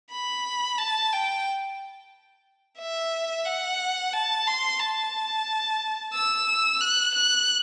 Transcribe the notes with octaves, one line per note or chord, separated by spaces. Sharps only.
B5
A5
G5
E5
F#5
A5
C6
A5
E6
F#6
F#6